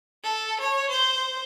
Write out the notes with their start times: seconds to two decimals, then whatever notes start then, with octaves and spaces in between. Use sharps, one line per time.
0.24 A4
0.60 C#5
0.90 C5